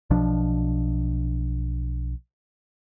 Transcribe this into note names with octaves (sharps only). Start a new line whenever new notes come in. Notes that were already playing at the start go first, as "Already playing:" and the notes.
B1 B2 F3 D4